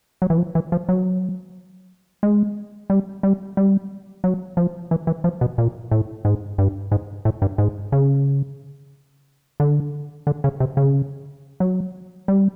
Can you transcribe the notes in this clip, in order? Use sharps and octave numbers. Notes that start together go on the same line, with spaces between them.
F#3
E3
F3
E3
F3
F#3
G#3
G3
G3
G3
F#3
F3
E3
E3
F3
B2
A#2
A2
G#2
G2
G#2
A2
G2
G#2
C#3
D3
D3
C#3
C3
C#3
F#3
G3